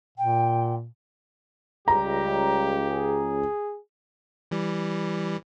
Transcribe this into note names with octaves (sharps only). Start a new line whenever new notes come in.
A#2 G5
C#2 G3 G4 A#5
G#4
E3 G3